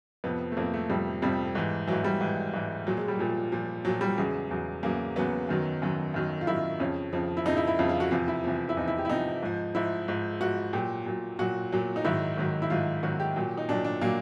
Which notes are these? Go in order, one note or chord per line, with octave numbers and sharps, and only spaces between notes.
F2 C3 F3 B3
A3
F2 C3 F3 A#3
A3
F2 C3 F3 G3
F2 C3 F3 G3
G#2 E3
G#2 E3 F#3
G3
G#2 E3
G#2 E3
A#2 F3 F#3
G#3
G3
A#2 F3
A#2 F3
A#2 F3 F#3
G3
E2 C#3 F#3 G#3
E2 C#3 F#3
E2 C#3 F#3 A#3
E2 C#3 F#3 B3
F#2 D#3 F#3
F#2 D#3 F#3
F#2 D#3 F#3
F4
F#2 D#3 F#3 E4
F2 C#3 F3 C#4
F2 C#3 F3
E4
F2 C#3 F3 D#4
E4
E4
F2 C#3 F3 F4
F4
F#4
E2 C3 F3 F4
E4
E2 C3 F3
E4
E2 C3 F3 D#4
E4
G4
E4
E2 C3 F3 D#4
G#2 F3
G#2 F3 E4
G#2 F3
G#2 F3 F#4
A#2 F#3 G4
A#2 F#3
A#2 F#3 F#4
A#2 F#3
D#4
G#2 D#3 F#3 E4
G#2 D#3 F#3
E4
G#2 D#3 F#3 F4
G#2 D#3 F#3 F#4
G4
A#2 F#3
D#4
A#2 F#3 D4
D4
A#2 F#3 A#3